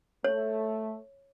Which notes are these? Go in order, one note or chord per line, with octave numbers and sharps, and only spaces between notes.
A3 C#5